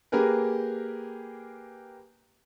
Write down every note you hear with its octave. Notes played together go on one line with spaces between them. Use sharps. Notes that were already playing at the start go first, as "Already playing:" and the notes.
A#3 G4 G#4 A#4 B4